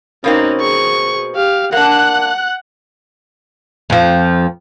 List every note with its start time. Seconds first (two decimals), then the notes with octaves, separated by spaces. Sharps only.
0.24 B2 A#3 C4 C#4 D#4
0.59 G#4 C#6
1.35 G4 F5
1.72 A#3 D4 F#5 F#6
3.90 F2 F3